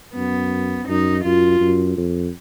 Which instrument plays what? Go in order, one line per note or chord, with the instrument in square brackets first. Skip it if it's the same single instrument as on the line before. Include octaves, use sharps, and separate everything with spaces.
[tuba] F#2 [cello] B3
[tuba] F#2 [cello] D#4
[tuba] F#2 [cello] F4
[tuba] F#2
F2